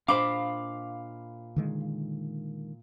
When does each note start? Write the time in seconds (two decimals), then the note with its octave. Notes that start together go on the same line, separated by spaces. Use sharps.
0.08 A#2 D4 C5 D#5 F5 B5 D6
1.56 D3 D#3 G#3